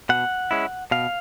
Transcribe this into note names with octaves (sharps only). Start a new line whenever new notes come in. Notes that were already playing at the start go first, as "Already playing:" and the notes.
B2 F#5
G#3 C#4 E4
B2 F5